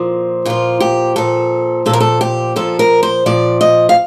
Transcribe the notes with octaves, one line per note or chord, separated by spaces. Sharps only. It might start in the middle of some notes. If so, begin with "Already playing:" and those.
Already playing: A#2 F3
A#2 F3 F4
G4
A#2 F3 A4
A#2 F3 A4 A#4
A4
G4
A#2 F3 A4
A#4
C5
A#2 F3 D5
D#5
F5